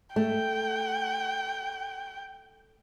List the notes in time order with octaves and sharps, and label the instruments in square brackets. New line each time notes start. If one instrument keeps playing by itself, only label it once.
[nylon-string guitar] A3 [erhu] G5